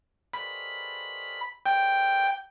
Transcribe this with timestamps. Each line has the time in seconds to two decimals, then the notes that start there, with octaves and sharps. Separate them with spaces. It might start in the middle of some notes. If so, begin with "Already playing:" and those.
0.34 B5
1.66 G5